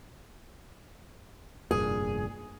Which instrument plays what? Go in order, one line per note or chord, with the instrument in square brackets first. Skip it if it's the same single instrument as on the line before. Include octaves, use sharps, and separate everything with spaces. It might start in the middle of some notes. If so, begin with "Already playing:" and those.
[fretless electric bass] F1 G2 A#2 [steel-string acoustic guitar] G#4